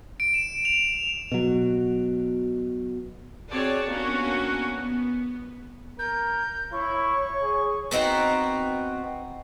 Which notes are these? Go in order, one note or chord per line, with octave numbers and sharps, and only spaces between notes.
D7
E7
F7
B2 F#3
C4 F#4 G#4 C#5 D5 A5
A#3 B3 C#4 D4 F#4
B3
A#4 G6
E4 C#5 C#6
G#4
B3 C4 D#4 F#4